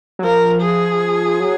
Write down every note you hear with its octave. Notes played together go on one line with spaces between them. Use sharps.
F#3
F3 A#4
G#4
F#3